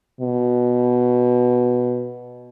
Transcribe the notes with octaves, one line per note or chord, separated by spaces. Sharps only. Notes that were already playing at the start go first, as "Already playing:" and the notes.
B2